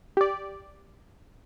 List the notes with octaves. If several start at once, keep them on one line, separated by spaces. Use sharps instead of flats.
G4 D5